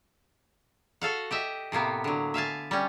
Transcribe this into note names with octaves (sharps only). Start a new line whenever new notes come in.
F#4 A4 F5 F#5
G4 D#5 E5
A2 C3 A#3 B3
D3 F#3
E5 F5 G#5 A5
G3 C#4